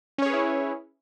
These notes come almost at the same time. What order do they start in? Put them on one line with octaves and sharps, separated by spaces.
C#4 C#5 G#4 B4 E4